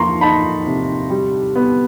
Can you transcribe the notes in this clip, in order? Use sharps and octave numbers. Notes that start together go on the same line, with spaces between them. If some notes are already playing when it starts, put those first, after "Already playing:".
Already playing: F3 A#3 A#5 C6 C#6
D#4 A5 B5
C3
G3
B3